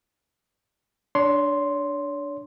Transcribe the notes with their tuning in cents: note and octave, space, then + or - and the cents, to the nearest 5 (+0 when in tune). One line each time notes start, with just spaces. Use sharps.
D4 +0 C#5 +35 C6 +0